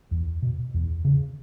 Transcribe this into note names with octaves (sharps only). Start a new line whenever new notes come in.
E2
B2
E2
C#3